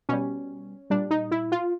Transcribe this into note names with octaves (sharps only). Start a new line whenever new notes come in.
B2 G3 C#4
A#2 G3 D4
D#4
E4
F4